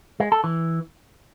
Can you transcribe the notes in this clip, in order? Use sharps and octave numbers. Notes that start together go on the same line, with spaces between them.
G#3
A4
E3